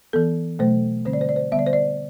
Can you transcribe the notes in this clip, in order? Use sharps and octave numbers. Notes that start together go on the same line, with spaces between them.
E3 B3 A4
B2 F#3 A3 C5
D3 G3 C4 C5
D5
C5
D5
C5
D3 G3 B3 E5
D5
C5
D5